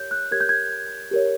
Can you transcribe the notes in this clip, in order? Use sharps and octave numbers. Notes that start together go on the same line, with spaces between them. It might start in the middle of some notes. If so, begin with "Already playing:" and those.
Already playing: G4 A#4 C#5 G6
F#6
G4 A#4 C#5 G#6
G6
G#6
G4 A#4 C#5